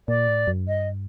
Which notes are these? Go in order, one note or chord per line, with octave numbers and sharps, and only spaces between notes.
A#2 D5
A2
F#2
G2 D#5